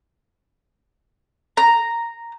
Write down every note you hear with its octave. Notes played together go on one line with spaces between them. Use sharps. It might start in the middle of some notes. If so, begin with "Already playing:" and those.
A#5